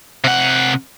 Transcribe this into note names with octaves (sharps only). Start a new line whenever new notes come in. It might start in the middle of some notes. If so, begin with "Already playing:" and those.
C3 F#5